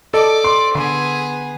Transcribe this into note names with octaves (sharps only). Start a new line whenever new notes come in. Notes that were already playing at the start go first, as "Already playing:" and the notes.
A4 D5 D#5 A5 D6
C6
D3 B3 G#4 C6